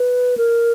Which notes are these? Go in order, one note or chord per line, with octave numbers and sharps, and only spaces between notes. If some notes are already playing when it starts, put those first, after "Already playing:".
Already playing: B4
A#4